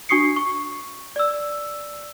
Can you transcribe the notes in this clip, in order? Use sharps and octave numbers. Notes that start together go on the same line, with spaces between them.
D4 F#4 C#6 D#6 C7 C#7
C#6
D5 E6